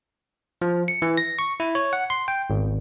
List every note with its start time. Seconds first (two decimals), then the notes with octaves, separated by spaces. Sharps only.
0.62 F3
0.88 C#7
1.02 E3
1.17 A#6
1.39 C#6
1.60 E4
1.75 C#5
1.93 F#5
2.10 C6
2.28 G5
2.50 G#1